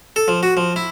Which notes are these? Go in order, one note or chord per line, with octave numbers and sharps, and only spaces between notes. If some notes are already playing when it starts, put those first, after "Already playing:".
A4
F3
F#4
F3
E4